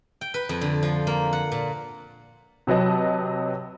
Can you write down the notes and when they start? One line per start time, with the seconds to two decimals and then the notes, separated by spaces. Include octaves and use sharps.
0.21 G5
0.34 B4
0.49 F2
0.61 D3
0.83 F3
1.07 A#3
1.33 F#5
1.52 A#2
2.67 C3 F#3 B4 D#5 A5